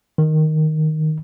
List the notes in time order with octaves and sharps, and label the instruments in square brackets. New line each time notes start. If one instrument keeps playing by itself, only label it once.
[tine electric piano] D#3